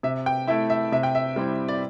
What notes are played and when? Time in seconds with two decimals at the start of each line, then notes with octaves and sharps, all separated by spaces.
0.03 C3 E5
0.26 G5
0.47 A3 E4 E5
0.70 E5
0.92 C3 E5
1.03 G5
1.15 E5
1.36 G3 C4 E4
1.69 D5